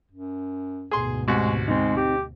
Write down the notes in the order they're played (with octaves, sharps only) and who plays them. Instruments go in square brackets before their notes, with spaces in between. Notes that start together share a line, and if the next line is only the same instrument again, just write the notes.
[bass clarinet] F#2
[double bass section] D2 G#2 B2 [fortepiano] G#4 C6
[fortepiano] C2 F#4 [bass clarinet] G#3
[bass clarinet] G#3 [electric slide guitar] C4 D#4
[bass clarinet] G4